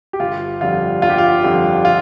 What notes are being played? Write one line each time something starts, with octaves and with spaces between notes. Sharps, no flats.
G4
G1 F4
F2 D3 G3 F4
G1 F4
G4
F4
F2 D3 G3
F4